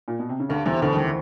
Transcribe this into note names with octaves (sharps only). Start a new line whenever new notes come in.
A#2
B2
C3
C#3
D2 G2 D3
E2 C3 E3
D2 B2 D3
D#3
C3 E3